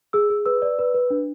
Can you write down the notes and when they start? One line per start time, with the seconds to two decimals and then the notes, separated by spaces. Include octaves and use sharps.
0.13 G#4 E6
0.30 G#4
0.46 B4 E6
0.62 D5
0.79 B4
0.94 B4
1.10 D4